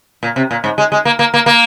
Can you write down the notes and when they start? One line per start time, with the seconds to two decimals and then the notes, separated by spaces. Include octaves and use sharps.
0.23 A#2
0.36 C3
0.51 A#2
0.64 G#2
0.78 G#3
0.92 G#3
1.05 A#3
1.19 A#3
1.34 A#3
1.46 A#3